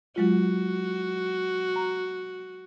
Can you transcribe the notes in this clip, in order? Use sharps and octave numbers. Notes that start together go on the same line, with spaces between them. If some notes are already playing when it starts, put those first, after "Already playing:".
F#3 G#3 F4 F#4
A#5